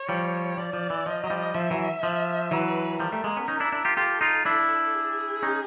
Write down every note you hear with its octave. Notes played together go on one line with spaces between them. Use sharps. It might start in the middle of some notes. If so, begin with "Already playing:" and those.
Already playing: C#5
F3 G3
F3 D5
F3
E3
F3 D#5
F#3
F3 G3
F3 E5
E3 F#3
F3
E3 F#3 B4
F3 G3 A#4
G3 A3
G#3 A#3
B3 C#4
C#4 D#4
D4 E4
D4 E4
F4 G4
F4 G4 A4
D#4 F4
D4 E4
G#4
C#4 D#4